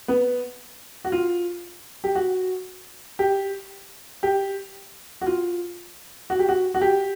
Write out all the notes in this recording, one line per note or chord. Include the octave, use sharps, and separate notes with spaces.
B3
F#4
F4
G4
F#4
G4
G4
F#4
F4
F#4
G4
F#4
F#4
G4